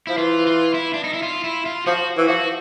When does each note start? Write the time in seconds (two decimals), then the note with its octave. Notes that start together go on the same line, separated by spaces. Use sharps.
0.07 F3 E4
0.18 E3 F4
0.47 F4
0.74 E4
0.94 D4
1.04 D#4
1.14 E4
1.23 F4
1.44 E4
1.66 F4
1.86 F3 F#4
2.17 E3
2.28 F3 F#4